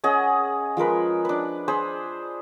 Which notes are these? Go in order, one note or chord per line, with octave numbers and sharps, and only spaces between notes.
C#4 G#4 D#5 F#5
F3 G#3 A#4 B4
D4 B4
G#4 C5 B5